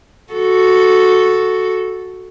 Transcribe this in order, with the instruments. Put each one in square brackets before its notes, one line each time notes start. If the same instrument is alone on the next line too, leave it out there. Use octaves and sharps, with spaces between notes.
[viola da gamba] F#4 A4